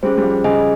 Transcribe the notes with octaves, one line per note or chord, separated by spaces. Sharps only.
G3 C#4 G#4 C5
G3
F3
C#3 G#4 D#5 G#5